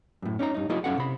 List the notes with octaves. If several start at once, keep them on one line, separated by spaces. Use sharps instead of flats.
F#2 A2
C#4 D#4 E4 A#5
G2 D#4
F#3 A#3 E4 F#4 G#4 D#5
F#2 F#3 C#4 A4 F5 F#5
C3 B5